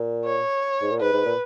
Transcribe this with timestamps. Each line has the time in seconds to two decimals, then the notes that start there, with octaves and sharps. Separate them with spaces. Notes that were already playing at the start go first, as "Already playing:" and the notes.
Already playing: A#2
0.25 C#5
0.82 G#2
0.91 A#2
1.00 G#2 B4
1.13 G#2
1.25 A#2